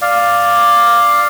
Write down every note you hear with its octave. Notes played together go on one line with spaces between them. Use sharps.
D5 F5